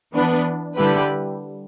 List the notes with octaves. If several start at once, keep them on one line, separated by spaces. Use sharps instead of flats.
E3 B3 D4 B4
D3 G3 E4 G4 B4